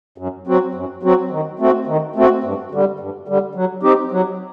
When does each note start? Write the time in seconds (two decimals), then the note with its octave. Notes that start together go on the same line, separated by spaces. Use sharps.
0.18 F#2
0.47 F#3 C4 F#4
0.75 F#2
1.03 F#3 C4 F#4
1.31 D#3
1.60 A3 C4 F#4
1.87 D#3
2.16 A3 C4 F#4
2.44 G2
2.72 D3 G3
3.00 G2
3.28 D3 G3
3.55 F#3
3.83 C4 D#4 G4
4.12 F#3